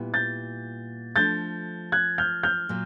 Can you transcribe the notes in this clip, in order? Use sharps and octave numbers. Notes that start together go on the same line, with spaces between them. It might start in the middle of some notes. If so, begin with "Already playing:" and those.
Already playing: A#2 G3 B3 E4
G6 A6
F3 A3 D4 G6 A6
F#6 G#6
F6 G6
F6 G6
A#2 F#3 A#3